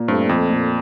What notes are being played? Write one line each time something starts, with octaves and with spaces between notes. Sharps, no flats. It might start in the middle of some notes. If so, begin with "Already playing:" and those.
Already playing: A#2
G2 A3 C4
F2
A#2